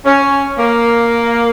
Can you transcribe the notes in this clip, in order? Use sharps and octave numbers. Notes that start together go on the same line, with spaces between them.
C#4
A#3